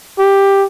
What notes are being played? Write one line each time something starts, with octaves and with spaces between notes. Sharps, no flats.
G4